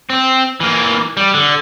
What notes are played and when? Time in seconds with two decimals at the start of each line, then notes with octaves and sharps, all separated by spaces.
0.10 C4
0.60 E3 A#3
1.17 G3
1.34 D3